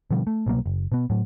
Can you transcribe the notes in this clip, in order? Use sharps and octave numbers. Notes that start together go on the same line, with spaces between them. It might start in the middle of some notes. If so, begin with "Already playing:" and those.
B2 D3 F3 G3
A3
C2 B2 F#3 A#3
F#1
B2 B3
A2 F#3